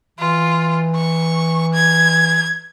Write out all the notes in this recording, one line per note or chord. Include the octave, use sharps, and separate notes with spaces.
E3 F4
C#6
G#6